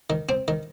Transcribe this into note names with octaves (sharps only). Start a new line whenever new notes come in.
D#3
C4
D#3